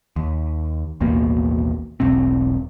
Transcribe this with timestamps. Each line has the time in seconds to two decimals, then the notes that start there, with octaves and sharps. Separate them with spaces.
0.16 D#2
1.01 A1 D#2 B2 A#3
2.00 E1 B1 C4